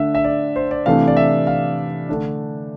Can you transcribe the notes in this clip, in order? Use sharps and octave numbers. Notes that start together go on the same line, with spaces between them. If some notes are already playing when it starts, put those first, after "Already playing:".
Already playing: D3 A3 D4 E5
E5
D5
C5
D5
C3 E3 A3 D4 F5
D5
E5
F5
D3 A3 D4